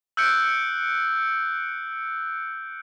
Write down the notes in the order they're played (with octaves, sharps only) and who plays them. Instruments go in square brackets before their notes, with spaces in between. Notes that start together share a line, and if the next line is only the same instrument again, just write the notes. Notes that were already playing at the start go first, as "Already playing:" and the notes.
[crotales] E6 F#6 G6 C#7 D7